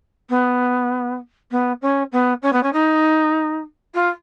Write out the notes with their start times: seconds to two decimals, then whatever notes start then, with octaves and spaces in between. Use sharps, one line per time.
0.30 B3
1.51 B3
1.82 C#4
2.12 B3
2.42 C#4
2.52 B3
2.63 C#4
2.73 D#4
3.94 F4